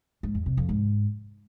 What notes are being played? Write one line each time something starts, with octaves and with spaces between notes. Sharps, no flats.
G#2
E2
C3
F2
G#2